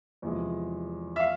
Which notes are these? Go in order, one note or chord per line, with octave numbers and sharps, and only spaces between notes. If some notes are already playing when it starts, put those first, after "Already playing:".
E2 C3 F3 G#3
E5
F5